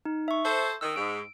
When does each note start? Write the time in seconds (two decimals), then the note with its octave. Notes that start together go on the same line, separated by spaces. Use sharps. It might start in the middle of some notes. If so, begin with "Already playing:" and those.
0.05 D#4
0.28 E5 C#6
0.44 A4 C5
0.81 D#3 E6
0.96 G#2 D7